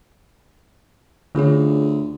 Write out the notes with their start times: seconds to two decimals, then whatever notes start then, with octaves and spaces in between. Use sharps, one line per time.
1.35 D2 D3 C#4 F4 G#4